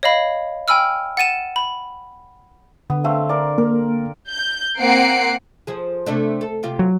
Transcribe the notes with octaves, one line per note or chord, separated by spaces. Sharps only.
C#5 D#5 F5 B5
G5 G#5 B5 E6 F6
F#5 A6 D#7 E7
B5
D3 B3
A3 C4 F5
A#4 D5
A#3 A#4
G6
A#3 C4 F#5 C7 D7
F3 G#4
C3 A3 D4
A4
C3 F4 G4
F#3